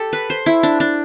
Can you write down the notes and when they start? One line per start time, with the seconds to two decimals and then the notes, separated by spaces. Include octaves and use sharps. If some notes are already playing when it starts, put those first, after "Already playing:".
Already playing: G4 A4
0.13 B4
0.30 C5
0.46 E4
0.63 D4
0.80 D4